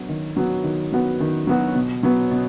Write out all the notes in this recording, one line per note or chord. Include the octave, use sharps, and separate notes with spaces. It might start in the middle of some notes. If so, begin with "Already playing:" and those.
Already playing: F#3 B3 F#4
D#3
F#3 B3 F#4
D#3
F#3 B3 F#4
D#3
F#3 B3 F#4
B2
F#3 B3
B2